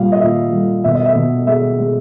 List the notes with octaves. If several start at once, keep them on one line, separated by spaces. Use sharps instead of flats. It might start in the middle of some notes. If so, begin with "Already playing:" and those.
Already playing: A#2 G3 F5
D#5
A#2 E5
G3
B2 E5
D#5
E5
B2
G#3 E5
G#3